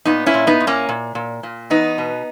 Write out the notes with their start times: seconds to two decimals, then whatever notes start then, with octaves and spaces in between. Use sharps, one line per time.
0.05 A#2 B3 D#4
0.26 C#4 E4
0.34 A#2
0.47 B3 D#4
0.60 A#2
0.67 A#3 C#4
0.89 A#2
1.15 A#2
1.43 A#2
1.70 E2 B3 D#4
1.98 B2